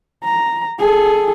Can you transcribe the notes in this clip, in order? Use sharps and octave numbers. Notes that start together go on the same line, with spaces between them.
A#5
G#4 A4